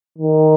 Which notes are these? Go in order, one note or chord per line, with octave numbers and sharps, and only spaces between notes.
D#3